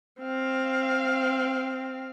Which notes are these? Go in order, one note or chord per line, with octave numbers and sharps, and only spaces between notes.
C4 F5